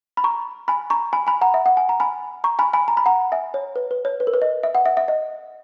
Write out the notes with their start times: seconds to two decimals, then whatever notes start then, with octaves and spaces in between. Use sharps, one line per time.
0.17 B5
0.24 A#5 C#6
0.68 G#5 B5
0.90 A#5 C#6
1.13 G#5 B5
1.27 G#5 B5
1.41 F#5 A#5
1.54 E5
1.66 F#5
1.77 G#5
1.89 A#5
2.00 G#5 B5
2.44 A#5 C#6
2.59 G#5 B5
2.73 G#5 B5
2.88 A#5
2.97 B5
3.06 F#5 A#5
3.32 E5 G#5
3.54 C#5
3.76 B4
3.91 B4
4.05 C#5
4.20 B4
4.27 A#4
4.34 B4
4.42 D#5
4.63 E5
4.75 F#5
4.86 E5
4.97 E5
5.08 D#5